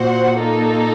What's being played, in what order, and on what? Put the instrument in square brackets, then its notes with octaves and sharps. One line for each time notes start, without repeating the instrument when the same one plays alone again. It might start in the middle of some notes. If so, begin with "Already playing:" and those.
Already playing: [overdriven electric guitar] A#2 [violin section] F#4 C5 F#5
[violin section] A#3 D#4 A4